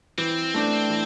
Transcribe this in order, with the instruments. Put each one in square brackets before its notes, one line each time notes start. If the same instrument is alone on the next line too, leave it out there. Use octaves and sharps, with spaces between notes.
[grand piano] E3 [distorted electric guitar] C4
[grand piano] A3 D4
E3